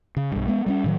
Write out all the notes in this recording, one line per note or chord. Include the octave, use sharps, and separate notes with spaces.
C#3
B1 G2
G#3 B3
G3 A3 C#4
A2 D#3 F#3